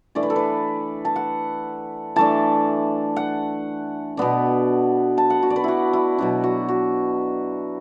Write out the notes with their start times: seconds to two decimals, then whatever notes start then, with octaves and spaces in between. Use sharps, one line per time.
0.15 E3 A3 D4 D5
0.23 B4
0.30 A4
0.36 B4
1.05 A5
1.16 F#5
2.16 E3 A3 D4 A5
3.16 F#5
4.17 B2 B3 D4
5.18 A5
5.30 F#5
5.43 F#4
5.50 D5
5.56 B4
5.64 E4 F#4
5.93 E4
6.18 B2 F#3 D4 F#4
6.44 F#4
6.69 F#4